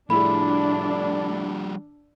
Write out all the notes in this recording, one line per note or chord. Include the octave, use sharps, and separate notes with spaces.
A2 F3 G3 D4 E4 G#4 B5